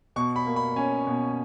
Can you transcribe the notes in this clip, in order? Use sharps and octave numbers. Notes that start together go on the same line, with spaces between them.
B2 C#6
B5
A#3
B5
C#4 G#5
B2